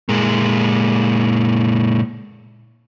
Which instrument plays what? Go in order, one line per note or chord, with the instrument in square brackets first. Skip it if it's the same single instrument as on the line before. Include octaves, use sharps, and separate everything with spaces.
[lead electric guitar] A#2 G#3